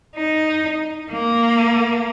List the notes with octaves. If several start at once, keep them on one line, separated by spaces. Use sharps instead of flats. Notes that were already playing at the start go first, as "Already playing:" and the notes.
D#4
A#3